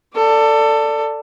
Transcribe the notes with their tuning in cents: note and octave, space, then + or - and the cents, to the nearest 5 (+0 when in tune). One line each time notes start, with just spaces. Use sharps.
A4 +20 D5 +0